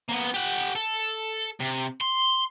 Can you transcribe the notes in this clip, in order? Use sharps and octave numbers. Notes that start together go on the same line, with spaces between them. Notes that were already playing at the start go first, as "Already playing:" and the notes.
A#3 B3
G4 F#5
A4
C3
C6